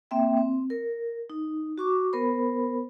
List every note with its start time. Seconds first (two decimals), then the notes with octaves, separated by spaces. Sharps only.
0.11 A#3 C4 E5 G5
0.37 C4
0.70 A#4
1.30 D#4
1.78 F#4 C#6 D6
2.13 B3 A#4 C5 B5